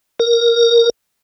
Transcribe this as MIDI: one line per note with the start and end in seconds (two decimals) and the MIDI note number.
0.19 0.90 70